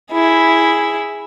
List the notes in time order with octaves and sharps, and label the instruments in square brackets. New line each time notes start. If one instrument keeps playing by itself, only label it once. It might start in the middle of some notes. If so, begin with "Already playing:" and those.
[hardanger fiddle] E4 G#4